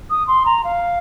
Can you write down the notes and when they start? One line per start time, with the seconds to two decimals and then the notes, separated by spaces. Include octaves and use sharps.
0.10 D#6
0.27 C6
0.46 A#5
0.64 F5